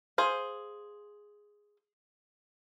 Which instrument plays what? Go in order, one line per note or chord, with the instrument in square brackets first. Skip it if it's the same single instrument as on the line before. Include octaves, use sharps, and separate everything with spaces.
[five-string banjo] G#4 C5 F5